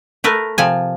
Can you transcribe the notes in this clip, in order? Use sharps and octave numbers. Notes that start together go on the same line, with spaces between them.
A3 A#4 B4
C3 F3 G#5